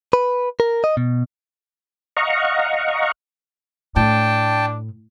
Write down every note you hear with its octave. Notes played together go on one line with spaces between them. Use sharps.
B4
A#4
D#5
B2
D#5 F5 F#5 A#5 C#6
A2 D4 G5 A5